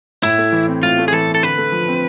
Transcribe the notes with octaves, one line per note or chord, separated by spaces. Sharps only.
A2 E4
A3
E3
C4
A2 F4
A3
G#4
E3 A4
C4
A4
D3 B4
A3
F3
C4